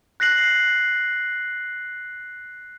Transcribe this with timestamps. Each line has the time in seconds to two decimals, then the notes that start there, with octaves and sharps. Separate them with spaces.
0.20 F#6 A#6 C7 F#7